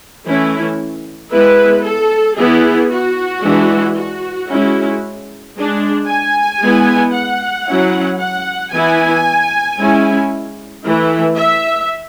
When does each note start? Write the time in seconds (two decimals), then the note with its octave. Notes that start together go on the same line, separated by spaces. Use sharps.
0.25 E3 A3 C#4 E4
1.31 G#3 B3 E4 B4
1.83 A4
2.37 E3 B3 E4 G#4
2.90 F#4
3.43 E3 G#3 D4
3.96 F#4
4.49 G#3 C#4 E4
5.54 G#3 D4
6.07 G#5
6.60 G#3 B3 E4
7.13 F#5
7.66 F#3 C#4 E4
8.19 F#5
8.72 E3 B3 E4 G#5
9.78 G#3 C#4 E4
10.84 E3 A3 E4
11.36 E5